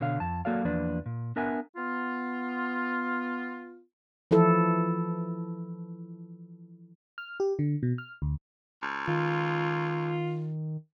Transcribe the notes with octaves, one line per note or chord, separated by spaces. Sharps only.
B2 D3 C#5 F5
F2 A5
F#3 A#3 F#4 A4 D5 F5
E2 F3 A#3 D4 B4 D5
A#2
B3 D4 A#4 E5 F#5 G#5
B3 F4
E3 F3 E4 A4
F6
G4
D3
B2
F6
D2
C#2
D#3 F4